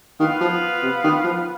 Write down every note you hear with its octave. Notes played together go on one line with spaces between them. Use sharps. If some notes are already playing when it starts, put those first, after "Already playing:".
D#3 B3 F4 B4 F5
F3
C3
D#3
F3